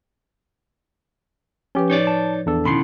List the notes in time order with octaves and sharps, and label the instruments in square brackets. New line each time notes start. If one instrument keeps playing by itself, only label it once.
[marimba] F3 B4 [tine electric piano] C#4 G4
[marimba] A2 [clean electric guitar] D#4 C#5 D5
[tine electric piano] A5
E2 D4 A4
[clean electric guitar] B2 D3 D#3 [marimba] C#4 E4 [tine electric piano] B5 C6 C7